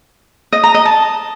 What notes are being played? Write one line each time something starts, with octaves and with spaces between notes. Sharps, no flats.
D#5
A#5
D#5
A5